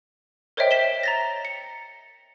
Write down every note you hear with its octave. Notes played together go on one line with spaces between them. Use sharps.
A#4 C5 C#5 D#5 E5 G5
B6 E7 G7
A#5 A6 A#6
C#7